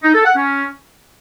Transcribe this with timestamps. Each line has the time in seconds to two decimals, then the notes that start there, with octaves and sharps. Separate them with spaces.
0.03 D#4
0.14 A4
0.25 F#5
0.35 C#4